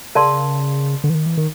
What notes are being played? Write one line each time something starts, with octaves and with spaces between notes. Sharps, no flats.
C#3 A#4 D5 F5 A5 C6
D3
E3
D#3
E3
D#3